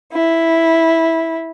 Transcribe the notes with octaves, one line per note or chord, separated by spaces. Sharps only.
E4